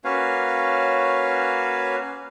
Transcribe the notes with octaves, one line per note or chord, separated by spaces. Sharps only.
A#3 C#4 F#4 B4 C#5 F5